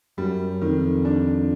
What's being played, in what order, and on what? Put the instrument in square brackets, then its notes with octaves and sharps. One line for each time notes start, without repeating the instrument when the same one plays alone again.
[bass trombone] F#2 [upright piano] G3
[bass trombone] F2 [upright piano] D#3
[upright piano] D4